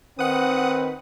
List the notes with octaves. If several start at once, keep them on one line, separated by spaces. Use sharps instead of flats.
D#3 C4 B4 F#5 D#6